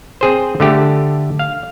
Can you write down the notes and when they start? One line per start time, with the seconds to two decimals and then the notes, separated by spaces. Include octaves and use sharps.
0.21 C4 G#4 C5
0.60 D3 A3 G4
1.39 F5